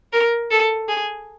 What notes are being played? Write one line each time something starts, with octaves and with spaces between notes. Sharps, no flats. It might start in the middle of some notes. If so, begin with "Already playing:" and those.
A#4
A4
G#4